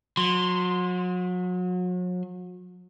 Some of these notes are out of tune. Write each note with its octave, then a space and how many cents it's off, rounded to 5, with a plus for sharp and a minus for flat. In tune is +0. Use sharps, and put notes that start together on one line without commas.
F#3 -35 C6 +0